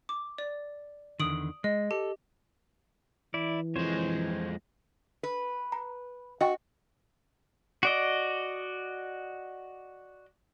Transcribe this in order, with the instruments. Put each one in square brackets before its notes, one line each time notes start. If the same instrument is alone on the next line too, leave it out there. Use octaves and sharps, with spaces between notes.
[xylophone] D6
D5
[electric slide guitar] E2 D3 D#3 [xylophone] D#6 D7 F#7
[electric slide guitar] G#3 [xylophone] D#5
[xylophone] G4 [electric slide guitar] A4
[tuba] E3 [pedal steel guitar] E4 D5
[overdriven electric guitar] F2 G#3 [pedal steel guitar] C5 C#5
[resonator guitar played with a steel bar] B4
[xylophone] A#5
[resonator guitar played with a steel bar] F#4 [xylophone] D#5 G5 C#6
[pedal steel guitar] F#4 D5 D#5